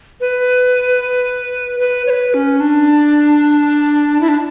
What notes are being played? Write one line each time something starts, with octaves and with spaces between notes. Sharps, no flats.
B4
B4
C#5
B4
C#4
D4
E4
D4